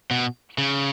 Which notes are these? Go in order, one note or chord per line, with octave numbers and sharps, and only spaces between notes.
B2
C#3